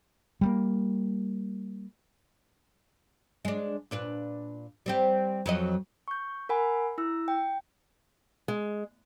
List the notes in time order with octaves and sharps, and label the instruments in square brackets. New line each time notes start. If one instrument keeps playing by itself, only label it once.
[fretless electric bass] G3 G#3 A#3
[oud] G#3 D4
A#2 D4 B4
G3 C4 G4
F2 F#3 D#5
[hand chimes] C#6 G6
A#4 F#5 G#5 B5
E4 E6
G5
[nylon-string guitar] G#3